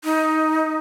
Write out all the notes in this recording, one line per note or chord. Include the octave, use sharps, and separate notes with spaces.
D#4